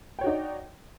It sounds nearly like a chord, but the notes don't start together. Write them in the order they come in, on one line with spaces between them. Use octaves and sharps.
G5 C#5 F#4 D#4 D5